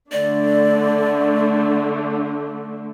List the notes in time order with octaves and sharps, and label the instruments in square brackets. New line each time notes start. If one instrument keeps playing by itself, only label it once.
[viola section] D3 A3 D4 [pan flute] D5